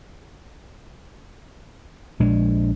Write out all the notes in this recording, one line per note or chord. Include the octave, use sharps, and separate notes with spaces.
A#1 G#3 D4